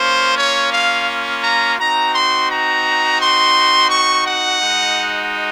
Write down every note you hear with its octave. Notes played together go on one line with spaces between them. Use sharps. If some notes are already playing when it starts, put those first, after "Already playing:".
Already playing: A#3 C#4 F4 C5
C#5
F5
A#5
C4 D#4 F#4 A#5
C6
A#5
C6
C#6
F#5
G#3 D#4 F#4